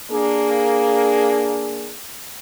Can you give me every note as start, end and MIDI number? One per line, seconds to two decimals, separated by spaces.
0.11 1.95 58
0.11 1.95 62
0.11 1.95 68